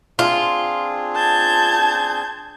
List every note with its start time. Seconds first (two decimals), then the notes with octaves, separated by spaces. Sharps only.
0.19 C4 D4 F4 G#4
1.15 A5 G6 G#6